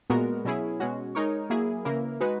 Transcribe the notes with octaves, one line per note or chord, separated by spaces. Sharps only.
A#2 G#3 B3 F#4 A#4
B2 F#3 C#4 E4 G#4
B2 G#3 C#4 F#4
G#3 D#4 A#4 C#5
F#3 A#3 E4 G#4
C#3 E3 A#3 E4 A#4
G#3 D#4 F#4 B4